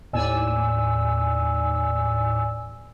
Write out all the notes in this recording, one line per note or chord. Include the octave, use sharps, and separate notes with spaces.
D#2 A2 D5 G#5 E6